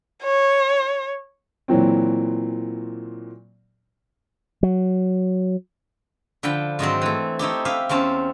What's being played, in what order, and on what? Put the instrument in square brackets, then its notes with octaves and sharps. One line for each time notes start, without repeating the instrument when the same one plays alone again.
[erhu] C#5
[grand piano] A#2 E3 F#3 C4
[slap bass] F#3
[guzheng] D3 F3 G5 B5
G#2 D#3 F#3 C4
E3 A3
A3 D#4 E4 G4
G4 E5 F5 G#5
E2 C4 C#4 A5